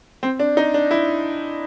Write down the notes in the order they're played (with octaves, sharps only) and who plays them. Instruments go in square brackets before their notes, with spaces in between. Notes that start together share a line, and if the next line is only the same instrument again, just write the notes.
[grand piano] C4
D4
D#4
D4
E4